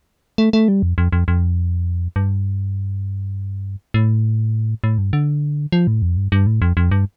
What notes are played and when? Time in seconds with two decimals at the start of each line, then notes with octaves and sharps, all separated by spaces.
0.38 A3
0.53 A3
0.68 G3
0.83 F2
0.98 F2
1.12 F2
1.28 F2
2.16 G2
3.94 A2
4.84 A2
4.98 G2
5.13 D3
5.72 F3
5.87 A2
6.02 F2
6.17 G2
6.32 G2
6.47 A2
6.62 F2
6.77 F2
6.91 G2